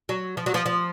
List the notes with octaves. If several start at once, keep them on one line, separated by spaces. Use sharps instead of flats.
F#3
F3
F#3
F3
F3